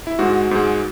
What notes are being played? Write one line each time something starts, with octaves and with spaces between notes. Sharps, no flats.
E4
G#2 G#3 F#4
G#2 G#3